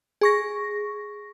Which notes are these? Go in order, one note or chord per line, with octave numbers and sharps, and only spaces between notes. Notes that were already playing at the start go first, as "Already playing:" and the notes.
G#4 C#6 A#6